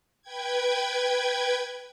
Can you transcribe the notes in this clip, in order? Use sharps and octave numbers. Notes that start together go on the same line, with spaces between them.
B4 G5 G#6